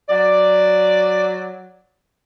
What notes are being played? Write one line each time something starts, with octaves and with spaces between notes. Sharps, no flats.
F#3 D5